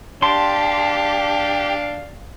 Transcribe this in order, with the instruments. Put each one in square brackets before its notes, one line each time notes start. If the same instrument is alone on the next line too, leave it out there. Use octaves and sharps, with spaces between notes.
[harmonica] D4 F5 [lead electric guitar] G4 [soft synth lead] A5 [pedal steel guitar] C6